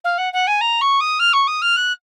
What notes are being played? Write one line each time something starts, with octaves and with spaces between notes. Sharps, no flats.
F5
F#5
F#5
G#5
A#5
C#6
D#6
F6
C#6
D#6
F6
F#6